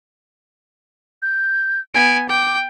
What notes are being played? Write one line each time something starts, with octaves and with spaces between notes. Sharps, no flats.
G6
B3 G#5 D7
G5 D6